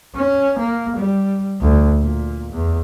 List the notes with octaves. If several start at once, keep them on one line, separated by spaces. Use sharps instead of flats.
C#4
A#3
G3
D2
A#2
E2